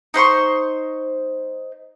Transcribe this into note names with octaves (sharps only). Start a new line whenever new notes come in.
D#4 C5 C6 C#6